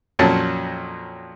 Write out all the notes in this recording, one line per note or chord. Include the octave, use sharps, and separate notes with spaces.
F2 A#2 F#3 C#4 A5